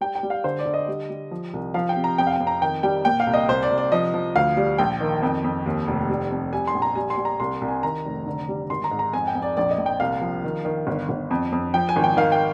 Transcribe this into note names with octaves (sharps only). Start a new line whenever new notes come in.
G3 G5
G5
G3
F5
D3 C5
D5
D3
D#5
G3
G3
F3
C2
F3 F5
G5
C3
A#5
F2 G5
F5
G5
F2
A#5
D#3 G5
G3 G5
A#2 G5
F5
C2
D#5
C2 C5
D5
C2
D5
F3 D#5
F3
D2 F5
G3
A#1 G5
D#3
F2
F2
D#2
F1
G3
F2
G3 G#5
C6
A#1
A#5
G3 G#5
C6
G3
A#5
C2 C6
C2
G#5
D#3 A#5
F1
D3
G3
G#1 C6
A#5
G#2
A#5
F2 G#5
G5
F2
D5
A#1 D5
D#5
A#1
G5
C2 F5
F3
D#3
D#3
G1
G1
F2
F2
F3 G5
G#5
G#1
G5
D#3 F5
G5